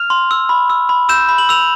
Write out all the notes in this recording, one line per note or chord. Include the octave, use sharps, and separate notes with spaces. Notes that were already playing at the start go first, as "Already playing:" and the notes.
Already playing: F6 F7
C6
E6
B5
E6
B5
E6 G6 E7
B5
F#7
E6 F7